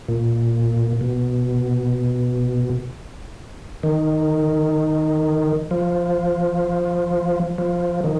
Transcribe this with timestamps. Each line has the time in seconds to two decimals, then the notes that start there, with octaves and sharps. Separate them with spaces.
0.08 A#2
1.01 B2
3.83 D#3
5.71 F3
7.58 F3
8.04 D#3